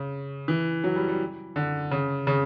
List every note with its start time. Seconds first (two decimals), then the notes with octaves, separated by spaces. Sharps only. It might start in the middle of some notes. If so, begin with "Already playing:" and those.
Already playing: C#3
0.48 E3
0.84 F#3
0.96 G3
1.08 G3
1.56 D3
1.91 C#3
2.27 C#3